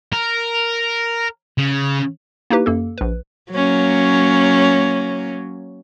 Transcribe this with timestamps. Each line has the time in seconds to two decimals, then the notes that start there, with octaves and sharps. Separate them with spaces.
0.12 A#4
1.58 C#3
2.50 A#3 D#4 E4 G4 B4
2.66 F#2 A#3 A4
2.98 A#1 B4
3.51 F#3 A#3 C#4